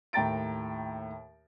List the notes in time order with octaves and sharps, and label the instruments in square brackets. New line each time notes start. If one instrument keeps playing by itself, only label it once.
[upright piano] D#2 A2 G5 A#5 A6 D7